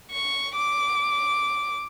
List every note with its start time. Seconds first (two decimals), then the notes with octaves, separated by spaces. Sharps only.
0.11 C#6
0.55 D6